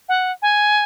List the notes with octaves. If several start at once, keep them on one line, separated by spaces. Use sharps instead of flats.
F#5
G#5